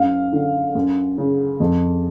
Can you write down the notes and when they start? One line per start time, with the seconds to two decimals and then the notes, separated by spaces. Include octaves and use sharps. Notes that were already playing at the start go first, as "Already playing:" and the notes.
Already playing: F#2 F5
0.33 D3
0.75 F#2
1.18 C#3
1.60 F2